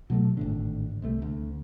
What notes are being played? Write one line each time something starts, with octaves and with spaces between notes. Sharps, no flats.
B2 F#3 G#3 A3
G#1 A2 D3
C2 C3 A3
D2